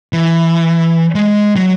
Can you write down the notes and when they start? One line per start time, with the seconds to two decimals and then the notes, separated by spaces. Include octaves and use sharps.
0.13 E3
1.15 G#3
1.56 F#3